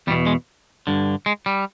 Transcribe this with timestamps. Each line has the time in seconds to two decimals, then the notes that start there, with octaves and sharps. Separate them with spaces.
0.07 E2 G3
0.11 B2
0.27 G#3
0.87 G2 D3
1.26 G#3
1.46 G3